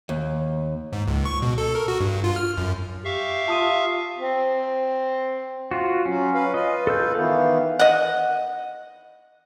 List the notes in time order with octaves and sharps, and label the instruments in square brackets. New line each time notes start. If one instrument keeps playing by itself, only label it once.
[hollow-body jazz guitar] D#2
[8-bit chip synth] G#2
C#2
C#6
B2
A4
A#4
F#4
G2
F4
F6
F#2
[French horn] G4 [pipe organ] E5 F5 C#6
[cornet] F4 [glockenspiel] A5 D#6 D#7
[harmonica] C4
[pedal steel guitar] F4 F#4
[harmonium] F#3 [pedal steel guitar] C#4
[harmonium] B4 F5
[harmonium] F4 B4 [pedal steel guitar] D#5
[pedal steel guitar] A4 E6 G6
[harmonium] D#3 E3 B3 [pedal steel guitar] F5
[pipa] D#5 F#5